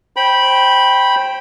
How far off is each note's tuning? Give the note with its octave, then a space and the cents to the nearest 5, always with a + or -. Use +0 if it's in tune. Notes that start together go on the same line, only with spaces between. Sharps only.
C5 +20 G5 -5 B5 -10